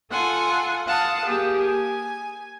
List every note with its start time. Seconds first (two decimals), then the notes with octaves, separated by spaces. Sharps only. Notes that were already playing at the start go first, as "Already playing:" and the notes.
0.11 F4 A4 F#5 G#5 C6
0.86 F5 F#5 A5 D#6
1.25 A#3 G4 G#4
1.60 G#5